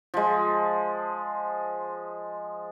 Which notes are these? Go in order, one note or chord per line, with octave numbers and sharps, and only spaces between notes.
F3 G#3